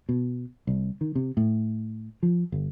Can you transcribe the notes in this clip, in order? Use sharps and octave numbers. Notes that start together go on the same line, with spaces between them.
B2
C2
D#3
C3
A2
F3
G1